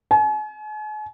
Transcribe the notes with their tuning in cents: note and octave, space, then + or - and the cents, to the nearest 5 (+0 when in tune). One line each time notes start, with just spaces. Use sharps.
G#5 +45